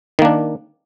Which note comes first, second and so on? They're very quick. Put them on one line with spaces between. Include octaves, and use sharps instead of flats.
D#3 A#3 D4